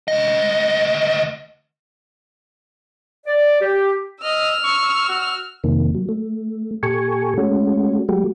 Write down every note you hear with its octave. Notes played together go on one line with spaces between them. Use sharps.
D2 D#5
D5
G4
D#5 E6 F6
C#6
F#4
F2 C3 D#3 A#3
F#3
A3
A#2 G4 A4 G#5 C#6
G#3 A3 C#4 F#4
F#3 G#3 A3 F#4 G4